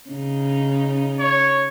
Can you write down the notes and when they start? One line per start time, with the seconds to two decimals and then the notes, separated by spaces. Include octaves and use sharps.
0.10 C#3 D#4
1.20 C#5